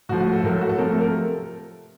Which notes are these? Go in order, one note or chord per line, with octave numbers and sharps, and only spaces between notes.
A2 F3 A3 F#4
F#4
A4
A2 F#3 A3 A#4
A4
F#4
A4
C3 F3 A3 A#4
A4
A#4